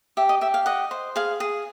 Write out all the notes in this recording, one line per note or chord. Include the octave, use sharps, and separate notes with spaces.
G4 E5
D#5
G4 E5
F5
D#5 F#5
C5
G#4 F5
G#4